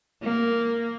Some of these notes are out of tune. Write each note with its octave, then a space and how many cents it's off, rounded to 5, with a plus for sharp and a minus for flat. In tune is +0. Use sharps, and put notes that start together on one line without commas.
A#3 -5